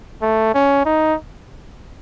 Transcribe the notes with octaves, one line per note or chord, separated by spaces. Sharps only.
A3
C#4
D#4